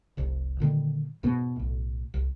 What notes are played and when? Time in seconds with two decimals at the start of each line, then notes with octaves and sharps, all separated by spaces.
0.17 F1 C2
0.60 A#2 D3 D#3 G3
1.23 E2 G#2 B2 B3
1.56 B1 A2
2.14 C2